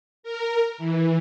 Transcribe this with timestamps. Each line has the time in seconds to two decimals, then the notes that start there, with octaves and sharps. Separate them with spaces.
0.23 A#4
0.78 E3